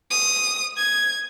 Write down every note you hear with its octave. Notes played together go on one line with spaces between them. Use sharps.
D#6
G#6